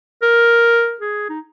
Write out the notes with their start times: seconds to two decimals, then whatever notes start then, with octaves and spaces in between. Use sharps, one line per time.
0.22 A#4
1.01 G#4
1.29 D#4